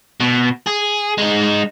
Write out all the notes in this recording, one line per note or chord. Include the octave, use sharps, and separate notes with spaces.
B2
G#4
G#3 D#4